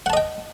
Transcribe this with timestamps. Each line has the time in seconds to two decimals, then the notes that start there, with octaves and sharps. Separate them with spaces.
0.06 F#5
0.10 A5
0.13 D#5
0.17 G5